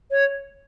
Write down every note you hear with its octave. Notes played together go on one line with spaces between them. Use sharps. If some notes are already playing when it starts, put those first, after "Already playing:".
C#5